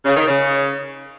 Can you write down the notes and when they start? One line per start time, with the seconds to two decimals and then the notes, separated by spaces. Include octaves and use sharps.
0.05 C#3
0.16 D#3
0.28 C#3